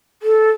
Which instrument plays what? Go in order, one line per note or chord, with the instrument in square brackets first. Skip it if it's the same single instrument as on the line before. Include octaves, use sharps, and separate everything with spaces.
[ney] A4